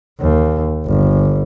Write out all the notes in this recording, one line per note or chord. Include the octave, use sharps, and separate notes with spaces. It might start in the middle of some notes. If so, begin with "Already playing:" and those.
D#2
G1